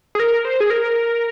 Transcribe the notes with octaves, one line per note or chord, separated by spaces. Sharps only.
G#4
A#4
C5
G#4
A#4